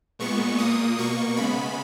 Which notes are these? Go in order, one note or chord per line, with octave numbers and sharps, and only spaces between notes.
A#2 G#3 B3 C#6
A#2 A#3 D#6
B2 A#3 C#6
C#3 G#3 B3 B5